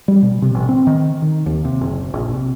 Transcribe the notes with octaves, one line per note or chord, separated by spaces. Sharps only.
G3
B2
C3
A1
C4
D#3
D#3
D#2
C3
F#1
A#1
C3